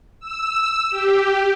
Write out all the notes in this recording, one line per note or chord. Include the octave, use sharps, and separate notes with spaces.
E6
G4